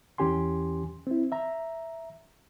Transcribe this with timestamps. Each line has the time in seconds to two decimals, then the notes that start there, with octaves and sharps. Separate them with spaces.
0.18 E2 E3 C#4 G4 G#5 C6
1.07 C4 E4
1.32 E5 A#5